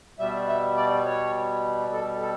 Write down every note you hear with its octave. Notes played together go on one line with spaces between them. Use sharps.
B2 G3 E5
E5
D5
C#5
A4
A4